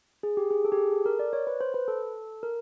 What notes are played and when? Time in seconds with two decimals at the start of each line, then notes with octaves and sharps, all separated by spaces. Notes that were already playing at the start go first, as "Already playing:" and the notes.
0.23 G#4
0.37 G4
0.51 G#4
0.65 A4
0.72 G4
0.78 G#4
0.92 A4
1.06 A#4
1.19 D5
1.33 C#5
1.47 B4
1.61 C5
1.74 B4
1.88 A4
2.43 A#4